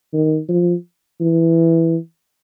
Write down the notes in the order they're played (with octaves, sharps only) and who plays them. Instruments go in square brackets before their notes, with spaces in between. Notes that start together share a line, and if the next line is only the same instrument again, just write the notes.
[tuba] D#3
F3
E3